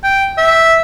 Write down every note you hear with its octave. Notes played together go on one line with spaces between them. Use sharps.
G5
E5